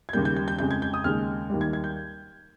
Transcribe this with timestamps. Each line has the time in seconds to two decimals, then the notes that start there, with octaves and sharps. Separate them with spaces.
0.09 G#6
0.13 D#2 C#3 G3 A#3 G6
0.25 G6
0.36 G6
0.48 G6
0.59 F2 C#3 G#3 G6
0.71 G#6
0.82 G6
0.94 D#6
1.04 D#2 C#3 G#3 F6
1.50 D#2 D#3 G3
1.61 G#6
1.73 G#6
1.84 G6